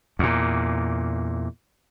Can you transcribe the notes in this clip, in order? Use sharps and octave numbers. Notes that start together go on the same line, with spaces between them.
E2 A#2